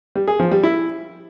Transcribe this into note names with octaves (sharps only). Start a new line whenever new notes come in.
G3
G#4
F3
G3
E4